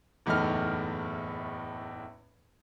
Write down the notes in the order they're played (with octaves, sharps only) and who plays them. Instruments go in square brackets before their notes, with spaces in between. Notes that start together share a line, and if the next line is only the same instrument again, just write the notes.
[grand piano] F#1 E2 A2 A3 D#4 F6